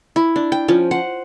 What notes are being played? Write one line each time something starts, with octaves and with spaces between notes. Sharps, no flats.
E4
D4
G5
F3 C#4
C5 F#5